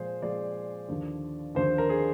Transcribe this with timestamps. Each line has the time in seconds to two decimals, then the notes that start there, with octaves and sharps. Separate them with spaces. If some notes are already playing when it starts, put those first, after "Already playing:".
Already playing: A#2 F3 G#3 G#4 C5
0.22 A#2 F3 G#3 D5
0.89 D#2 D3 F3
1.55 D#2 D3 F3 C5
1.78 A#4
1.89 G#4